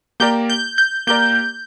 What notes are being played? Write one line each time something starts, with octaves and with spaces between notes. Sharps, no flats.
A#3 G4 A#4 D5 G6
G6
G6
A#3 G4 A#4 D5 G6